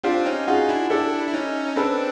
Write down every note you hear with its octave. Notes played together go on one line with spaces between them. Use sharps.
C4 D4 F4 G4
C#4 D#4
D#4 F4 F#4 G#4
D4 E4
D4 E4 G4 A4
E4
C#4 D#4
C4 D4 A4 B4